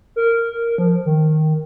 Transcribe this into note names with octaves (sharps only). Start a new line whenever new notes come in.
A#4
F3
D#3